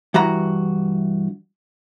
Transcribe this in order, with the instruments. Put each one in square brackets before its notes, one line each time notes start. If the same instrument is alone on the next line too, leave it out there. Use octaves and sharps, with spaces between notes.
[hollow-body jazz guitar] G2 E3 F#4 A#5